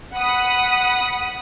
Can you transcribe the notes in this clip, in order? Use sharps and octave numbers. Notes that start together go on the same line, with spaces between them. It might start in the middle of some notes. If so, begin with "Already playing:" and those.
F#5 B5 D#6